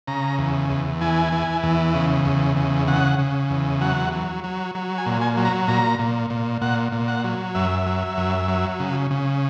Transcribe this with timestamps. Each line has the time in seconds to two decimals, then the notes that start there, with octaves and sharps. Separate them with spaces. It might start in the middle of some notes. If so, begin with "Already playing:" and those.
0.08 C#3 A#5
0.38 E2
0.70 E2
1.01 E3 G#5
1.32 E3
1.63 E2
1.94 C#3
2.25 E2
2.57 C#3
2.88 C#3 F#5
3.19 C#3
3.50 E2
3.81 F#3 F#5
4.13 F#3
4.44 F#3
4.75 F#3
4.98 G#5
5.06 A#2
5.21 G#5
5.37 F#3
5.45 A#5
5.68 A#2 A#5
5.99 A#2
6.30 A#2
6.62 A#2 F#5
6.92 A#2
7.08 F#5
7.24 F#3
7.55 F#2 E5
7.86 F#3
8.18 F#2
8.48 F#3
8.80 C#3
9.11 C#3